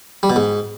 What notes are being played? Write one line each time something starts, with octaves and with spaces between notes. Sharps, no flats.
G3
B2
G#2